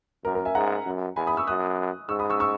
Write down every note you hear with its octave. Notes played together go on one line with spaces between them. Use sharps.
F#2 A#4
A#4
E5 G#5
G#2 F#5 A#5
F#2
E2 G#5 B5
B5 D#6
C#6 E6
F#2 D#6 F#6
G#2 C#6 E6
B5 D#6
C#6 E6
C#6 E6